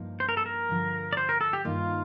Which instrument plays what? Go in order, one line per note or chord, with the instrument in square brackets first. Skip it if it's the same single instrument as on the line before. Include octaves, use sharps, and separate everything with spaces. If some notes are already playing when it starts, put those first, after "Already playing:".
Already playing: [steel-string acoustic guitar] G2 F3 A#3 D#4
[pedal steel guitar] C5
A#4
A4
A#4
[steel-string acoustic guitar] G2 D3 F3
[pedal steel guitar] D5
C5
A#4
A4
G4
[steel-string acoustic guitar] G2 D#3 A#3 D#4 A#4 [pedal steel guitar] F4